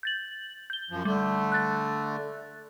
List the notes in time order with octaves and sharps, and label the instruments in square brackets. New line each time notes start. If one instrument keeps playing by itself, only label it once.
[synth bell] G6 A6 F#7
G6 G7
[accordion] F#2 F3
[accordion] D3 A3 [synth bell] G3
[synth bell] F#6 A6